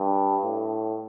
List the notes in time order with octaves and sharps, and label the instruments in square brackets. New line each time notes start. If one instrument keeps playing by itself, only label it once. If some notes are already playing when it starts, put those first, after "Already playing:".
Already playing: [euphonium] G2
A2